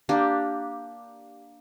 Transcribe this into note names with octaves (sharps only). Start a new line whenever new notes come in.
A#3 D4 G4